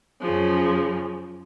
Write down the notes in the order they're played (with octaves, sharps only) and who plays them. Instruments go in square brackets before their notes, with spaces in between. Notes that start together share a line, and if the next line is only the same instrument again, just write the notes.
[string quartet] F#2 C#3 F3